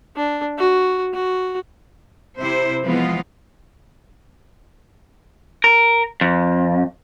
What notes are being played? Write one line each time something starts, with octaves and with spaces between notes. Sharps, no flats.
D4
F#4
F#4
C3 E4 C5
E3 F3 G#3 B3 F4
A#4
F2